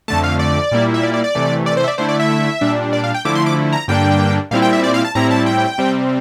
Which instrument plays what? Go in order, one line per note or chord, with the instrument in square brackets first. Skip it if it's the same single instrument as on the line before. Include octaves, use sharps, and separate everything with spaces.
[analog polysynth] F2 D3 A3 A5
F5
D5
A#2 G3 A#3 E4
E5
D5
D5
D5
C3 E3 A3
D5
C5
E5
D5
D3 A3 E4 C5
D5
E5
A#2 G3 D4
D5
F5
G5
D3 F3 A3 E4 D6
C6
D6
A#5
G2 D3 G3 A#3 D4 G5
A#2 G3 C4 E4 F5
G5
E5
D5
F5
A5
A2 G3 C4 E4 A#5
A5
G5
C3 G3 C4